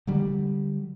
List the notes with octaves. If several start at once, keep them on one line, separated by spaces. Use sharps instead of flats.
D3 F#3 G3